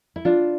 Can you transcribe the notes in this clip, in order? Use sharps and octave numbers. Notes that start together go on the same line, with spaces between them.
E4
D4 F4